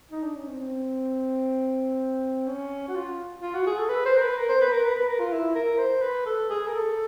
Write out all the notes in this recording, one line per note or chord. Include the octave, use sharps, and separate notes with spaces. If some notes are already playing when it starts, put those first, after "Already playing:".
D#4
D4
C#4
C4
C4
C#4
F#4
F4
F4
F#4
G#4
A4
B4
C5
A#4
B4
A#4
C5
B4
A#4
B4
B4
A#4
F4
E4
A#4
C5
B4
A4
G#4
A#4
A4